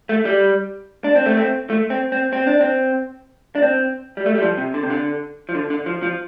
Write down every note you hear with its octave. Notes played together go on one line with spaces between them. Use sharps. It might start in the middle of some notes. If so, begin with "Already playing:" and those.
A3
G3
D4
C4
A3
C4
A3
C4
C4
C4
D4
C4
D4
C4
G3
A3
G3
F3
C3
D3
C3
D3
F3
D3
D3
F3
F3